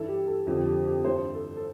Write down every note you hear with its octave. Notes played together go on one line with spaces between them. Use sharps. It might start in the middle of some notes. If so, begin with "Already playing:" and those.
Already playing: G2 E3 A4
G4
A4
F2 D3 F3 G4
G4
G4
G2 E3 C5
A4
A4